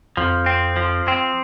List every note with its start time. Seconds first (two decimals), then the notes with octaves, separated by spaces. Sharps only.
0.17 F2 F3
0.46 C4
0.76 F3
1.08 C4